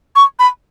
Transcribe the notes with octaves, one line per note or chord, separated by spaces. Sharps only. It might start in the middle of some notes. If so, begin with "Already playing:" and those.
C#6
B5